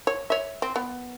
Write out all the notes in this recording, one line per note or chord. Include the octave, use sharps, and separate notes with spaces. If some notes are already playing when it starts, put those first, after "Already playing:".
C#5
C#5 E5
C4
B3